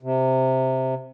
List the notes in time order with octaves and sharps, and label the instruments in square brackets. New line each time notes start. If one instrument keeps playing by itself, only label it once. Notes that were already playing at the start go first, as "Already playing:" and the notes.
[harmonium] C3